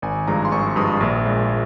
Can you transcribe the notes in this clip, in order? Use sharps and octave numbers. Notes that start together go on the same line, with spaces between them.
G#1 G#5
G2 F3 G#3 A#5
C6
G#1 C#6
G2 F3 G#3 D#6
A#1
A#2 G#3